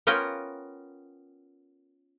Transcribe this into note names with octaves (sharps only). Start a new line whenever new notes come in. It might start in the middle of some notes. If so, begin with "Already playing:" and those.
B3 C#4 F4 A#4 G5